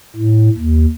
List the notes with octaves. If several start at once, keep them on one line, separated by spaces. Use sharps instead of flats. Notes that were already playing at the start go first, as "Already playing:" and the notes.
A2
D#2